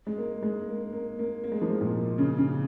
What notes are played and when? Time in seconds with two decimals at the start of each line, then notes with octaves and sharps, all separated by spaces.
0.07 G#3
0.18 A#3
0.42 G#3
0.68 A#3
0.92 A#3
1.19 A#3
1.44 A#3
1.52 G#3
1.62 F3
1.70 G#3
1.81 A#2
2.18 C#3
2.38 C#3